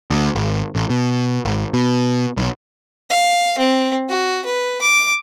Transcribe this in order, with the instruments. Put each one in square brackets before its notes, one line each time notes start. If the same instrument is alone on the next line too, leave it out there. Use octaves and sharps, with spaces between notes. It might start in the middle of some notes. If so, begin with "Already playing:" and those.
[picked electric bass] D2
G#1
A1
B2
G#1
B2
B1
[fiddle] F5
C4
F#4
B4
D6